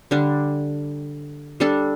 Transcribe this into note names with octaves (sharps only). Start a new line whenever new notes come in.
D3 G3 D4
G3 D4 A4